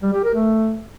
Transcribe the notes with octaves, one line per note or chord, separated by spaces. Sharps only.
G3
G4
A#4
A3